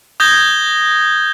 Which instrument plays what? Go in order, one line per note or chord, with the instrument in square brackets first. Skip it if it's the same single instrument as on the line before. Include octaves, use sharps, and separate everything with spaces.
[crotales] D#6 G6 G#6 A#6 G7